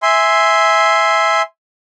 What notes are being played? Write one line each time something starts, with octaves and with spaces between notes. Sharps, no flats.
E5 G#5 C6